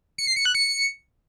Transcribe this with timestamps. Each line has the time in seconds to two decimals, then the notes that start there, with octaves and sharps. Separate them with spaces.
0.18 C#7
0.27 C7
0.36 C#7
0.45 F#6
0.55 C#7